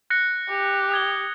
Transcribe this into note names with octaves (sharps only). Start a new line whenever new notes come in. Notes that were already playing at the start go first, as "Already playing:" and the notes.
F#6 A#6 C#7
G4
D#6 G#6 G7